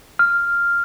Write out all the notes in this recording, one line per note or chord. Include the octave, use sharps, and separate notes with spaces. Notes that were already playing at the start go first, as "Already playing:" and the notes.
F6